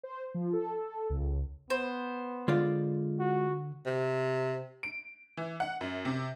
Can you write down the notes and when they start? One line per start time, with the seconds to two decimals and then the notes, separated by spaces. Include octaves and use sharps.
0.03 C5
0.34 F3
0.53 A4
1.10 C#2
1.70 B3 C5
2.48 D3 G#3 F4 D5
3.19 F#4
3.86 C3
4.83 D7
5.37 E3
5.60 F#5
5.81 F#2
6.05 C3